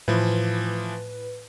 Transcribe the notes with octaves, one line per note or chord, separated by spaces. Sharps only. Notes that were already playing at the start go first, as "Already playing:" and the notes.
A2 E3 F3 B4